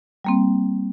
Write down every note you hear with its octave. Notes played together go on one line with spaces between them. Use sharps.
G3 A#3 C4